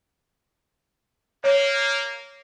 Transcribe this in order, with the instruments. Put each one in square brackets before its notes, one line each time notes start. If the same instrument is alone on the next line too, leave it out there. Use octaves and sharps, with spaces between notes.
[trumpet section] A#3 [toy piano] C#5